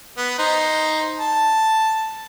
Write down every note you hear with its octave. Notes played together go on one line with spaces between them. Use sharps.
B3
D#4 C5
A5